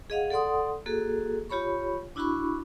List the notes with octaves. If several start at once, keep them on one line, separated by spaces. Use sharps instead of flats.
G#4 D#5 F5 F#5
A4 D5 F#5 C6 D#6
A#3 F#4 G#4 A4
F4 G4 C#5 B5 C#6
D4 E4 F#4 B5 C#6